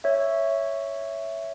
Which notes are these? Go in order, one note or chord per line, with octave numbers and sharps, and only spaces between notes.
C#5 E5